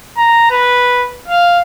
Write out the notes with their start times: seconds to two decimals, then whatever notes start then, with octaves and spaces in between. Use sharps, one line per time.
0.18 A#5
0.50 B4
1.28 F5